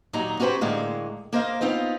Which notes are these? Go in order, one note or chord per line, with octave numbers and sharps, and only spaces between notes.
D#2 A#2 F#3 D#4 A#5
C#4 F#4 G4 B4 C5
A2 D3 G#3 A#3
A#3 A#4 C5 D#5 F5
B3 C4 D#4 F4